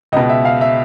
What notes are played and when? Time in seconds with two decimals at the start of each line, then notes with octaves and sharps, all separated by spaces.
0.12 C#2 D#5
0.16 B2
0.29 E5
0.45 F5
0.61 E5